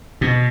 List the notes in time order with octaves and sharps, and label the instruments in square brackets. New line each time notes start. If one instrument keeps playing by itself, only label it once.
[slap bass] B2